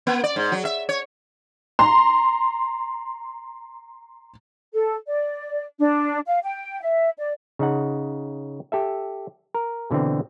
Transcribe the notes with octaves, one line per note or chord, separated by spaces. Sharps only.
A#3
D5
G#2
F#3
E5
C#5
A#5 C6
A4
D5
D4
F5
G5
E5
D5
C#3 D#4 F#5
G4 A4 E5
A#4
B2 D3 E3 C4